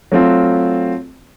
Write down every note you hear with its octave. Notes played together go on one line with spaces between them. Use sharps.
F#3 A3 C4 F4